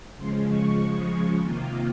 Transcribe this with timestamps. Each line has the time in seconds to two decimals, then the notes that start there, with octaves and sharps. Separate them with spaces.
0.17 C#3 F3 G#3 C6
0.48 C#6
0.79 C#6
1.40 C3 D#3 A#3 F4